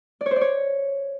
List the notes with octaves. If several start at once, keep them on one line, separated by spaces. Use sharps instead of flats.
D5
C#5
C5
D5
C#5